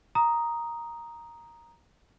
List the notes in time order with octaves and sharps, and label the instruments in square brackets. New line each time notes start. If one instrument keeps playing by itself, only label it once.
[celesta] A#5 D#6